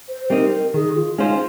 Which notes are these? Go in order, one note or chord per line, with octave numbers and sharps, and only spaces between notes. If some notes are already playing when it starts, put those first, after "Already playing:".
C5
G3 C4 D#4 A#4
A#4
D#3 G#4
F4
G#3 C#4 D#4 F4 C5